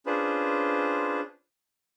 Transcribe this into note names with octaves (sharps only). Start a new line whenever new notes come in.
C#4 D4 F4 G#4 B4 C5